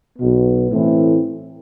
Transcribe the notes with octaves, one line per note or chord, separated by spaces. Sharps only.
B1 B2 B3
A2 E3 A3 C4 E4